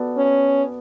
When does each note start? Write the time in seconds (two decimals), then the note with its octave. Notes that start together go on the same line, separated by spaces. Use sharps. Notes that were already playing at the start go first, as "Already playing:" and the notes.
Already playing: B3 F#4 A4 D5
0.17 C#4